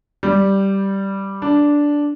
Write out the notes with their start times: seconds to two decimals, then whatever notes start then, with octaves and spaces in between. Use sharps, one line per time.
0.23 G3
1.42 D4